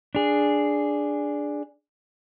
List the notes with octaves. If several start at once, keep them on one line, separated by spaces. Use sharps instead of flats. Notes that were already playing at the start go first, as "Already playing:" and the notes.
D4 G#4